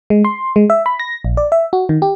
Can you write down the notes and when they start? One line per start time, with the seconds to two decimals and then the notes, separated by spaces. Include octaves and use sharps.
0.10 G#3
0.25 C6
0.56 G#3
0.70 E5
0.86 B5
1.00 A#6
1.25 A#1
1.37 D5
1.52 E5
1.73 F#4
1.89 D#3
2.02 G4